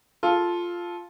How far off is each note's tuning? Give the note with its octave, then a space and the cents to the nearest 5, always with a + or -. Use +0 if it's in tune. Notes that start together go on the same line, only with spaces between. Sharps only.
F4 +0 A4 -10